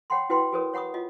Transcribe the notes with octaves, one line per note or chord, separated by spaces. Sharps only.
C#5 F#5 G5 B5 C6
E4 F#4 B4 G5 B5 C6
F#4 G#4 A#4 B4 C#5 D#6
C#5 F#5 B5 C#6 D#6
F4 D#5